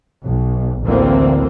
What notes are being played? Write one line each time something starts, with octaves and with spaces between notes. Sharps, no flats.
B1
A1 D2 D3 E3 A#3 C4